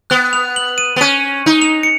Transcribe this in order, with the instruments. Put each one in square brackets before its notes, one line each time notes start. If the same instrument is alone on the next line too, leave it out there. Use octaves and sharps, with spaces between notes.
[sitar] B3 [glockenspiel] F#6
[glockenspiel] F7
F#7
D#7
[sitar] B3
[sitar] C#4 [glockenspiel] D#7
[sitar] D#4
[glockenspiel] F7
C#7